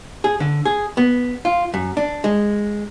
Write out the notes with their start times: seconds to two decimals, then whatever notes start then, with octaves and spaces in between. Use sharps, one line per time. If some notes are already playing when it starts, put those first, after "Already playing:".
0.24 G#4
0.40 D3
0.66 G#4
0.97 B3
1.45 F4
1.74 F#2
1.97 D4
2.24 G#3